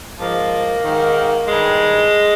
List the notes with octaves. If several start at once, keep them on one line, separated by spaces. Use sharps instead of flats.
G#2 F3 A#3
G#2 D#3
G2 D#3 G#3